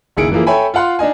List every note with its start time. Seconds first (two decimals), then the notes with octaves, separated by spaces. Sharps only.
0.17 F#1 D#3 E4 G#4 C#7 D7
0.32 E3 F3 A#3 E4 G#4
0.47 A4 C#5 E5 G5 G#5 B5
0.74 F4 F5 F#5 C6 F6
0.99 D4 D#4 D#5 G#5